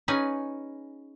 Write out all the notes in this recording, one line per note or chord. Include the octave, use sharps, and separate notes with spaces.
C#4 D#4 G#4 B4 G#5